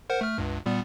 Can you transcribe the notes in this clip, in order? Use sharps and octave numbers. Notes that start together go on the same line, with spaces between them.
A#4 C5 F#5
A3 F6
C#2 G2
A#2 G3 B3